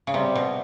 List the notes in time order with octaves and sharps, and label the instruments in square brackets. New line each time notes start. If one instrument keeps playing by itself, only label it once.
[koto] C#3
[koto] C3 [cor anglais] G3
[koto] B2